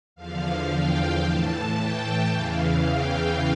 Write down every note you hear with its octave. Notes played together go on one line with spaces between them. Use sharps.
E2 D3 F3 F5
G5
A2 E3 A5
G5
E2 C#3 E3 F5
G5